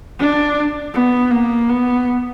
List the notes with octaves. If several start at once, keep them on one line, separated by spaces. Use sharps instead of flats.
D4
B3
A#3
B3